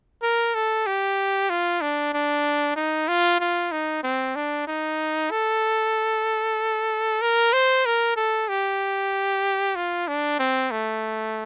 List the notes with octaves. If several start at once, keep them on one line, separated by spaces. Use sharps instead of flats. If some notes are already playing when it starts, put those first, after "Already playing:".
A#4
A4
G4
F4
D4
D4
D#4
F4
F4
D#4
C4
D4
D#4
A4
A#4
C5
A#4
A4
G4
F4
D4
C4
A3